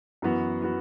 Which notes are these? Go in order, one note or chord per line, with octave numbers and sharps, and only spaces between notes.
F#2 E3 B3 F#4
E3 B3 F#4